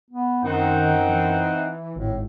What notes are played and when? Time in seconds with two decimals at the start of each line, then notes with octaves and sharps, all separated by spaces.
0.10 B3
0.44 F#2 D#3 C4 D#4 F#5
1.09 E3
1.96 G#1 A2